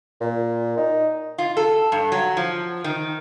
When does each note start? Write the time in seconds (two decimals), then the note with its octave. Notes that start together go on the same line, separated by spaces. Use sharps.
0.21 A#2
0.78 D#4
1.38 F4
1.57 A4
1.92 G2
2.12 F#3
2.37 F3
2.84 D#3